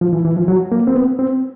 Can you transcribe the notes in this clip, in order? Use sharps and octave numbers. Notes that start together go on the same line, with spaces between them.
F3
E3
E3
F3
F#3
A#3
C4
B3
C4